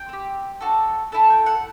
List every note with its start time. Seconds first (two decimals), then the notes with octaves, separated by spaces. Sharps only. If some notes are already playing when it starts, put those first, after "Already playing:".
Already playing: G5
0.09 C4 G4
0.61 D4 F#4 A4
1.12 A3 E4 A4 A5
1.30 G5
1.46 F#5